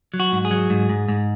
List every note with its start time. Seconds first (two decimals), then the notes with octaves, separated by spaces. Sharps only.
0.14 F#3
0.20 F#4
0.32 G#2
0.45 G#4
0.51 F#3
0.70 G#2
0.89 G#2
1.08 G#2